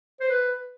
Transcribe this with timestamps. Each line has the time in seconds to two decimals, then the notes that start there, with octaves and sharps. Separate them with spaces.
0.20 C5
0.29 B4